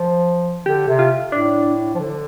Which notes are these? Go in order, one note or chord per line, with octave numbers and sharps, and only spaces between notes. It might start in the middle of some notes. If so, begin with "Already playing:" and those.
Already playing: F3
D3 G4
C3
F4
A2 D4
F3
D3